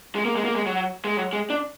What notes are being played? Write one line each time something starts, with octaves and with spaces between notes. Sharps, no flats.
G#3
A#3
G#3
A#3
G#3
F#3
G#3
F#3
G#3
D4